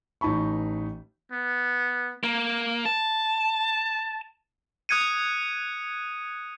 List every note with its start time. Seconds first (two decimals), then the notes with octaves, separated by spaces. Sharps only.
0.21 A1 E3 D#4 A5 B5 C#6
1.32 B3
2.23 A#3
2.86 A5
4.89 D#6 F#6 G#6 C#7 D#7